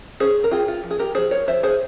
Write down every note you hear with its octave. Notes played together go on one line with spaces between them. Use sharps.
C#4 G#4 C5
A#4
C4 F4 G#4
F4
F3
G#4
G4 A#4
F3 G#4 C5
A#4 C#5
F3 C5 E5
G#4 C5